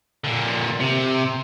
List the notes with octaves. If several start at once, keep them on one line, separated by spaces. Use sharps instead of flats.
A#2 D3
C3